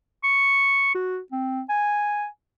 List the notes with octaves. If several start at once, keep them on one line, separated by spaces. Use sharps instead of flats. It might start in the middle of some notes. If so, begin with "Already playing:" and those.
C#6
F#4
C4
G#5